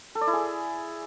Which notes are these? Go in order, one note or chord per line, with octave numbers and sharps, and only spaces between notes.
A4
D5
E4
G#4